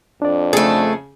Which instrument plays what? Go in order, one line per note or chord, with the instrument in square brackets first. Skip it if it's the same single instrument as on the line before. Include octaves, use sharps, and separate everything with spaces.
[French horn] F2 [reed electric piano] D4 D5
[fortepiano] C#3 G#4 [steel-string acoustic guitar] A3 A4